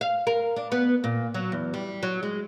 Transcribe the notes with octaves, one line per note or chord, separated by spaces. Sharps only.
F5
A#4
D4
B3
A#2
F#3
E2
G3
F#3
G#3